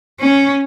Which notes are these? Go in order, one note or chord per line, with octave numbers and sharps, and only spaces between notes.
C#4